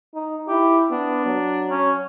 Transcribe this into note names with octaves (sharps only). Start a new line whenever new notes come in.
D#4
E4 G4
B3 D4
F#3
C#4